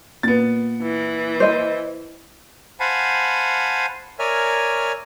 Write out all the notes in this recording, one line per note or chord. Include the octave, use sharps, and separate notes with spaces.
A#2 B3 A6
E3
C5 D#5
C5 F5 F#5 G#5 A5 B5
A#4 C#5 D5 E5 G#5 F6